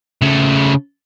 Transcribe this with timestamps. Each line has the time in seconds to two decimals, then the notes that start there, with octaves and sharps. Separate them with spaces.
0.22 C#3 A3